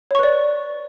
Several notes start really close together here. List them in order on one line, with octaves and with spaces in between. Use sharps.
C#5 C#6 B4 D5